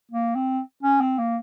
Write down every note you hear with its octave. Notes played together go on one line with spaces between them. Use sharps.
A#3
C4
C#4
C4
A#3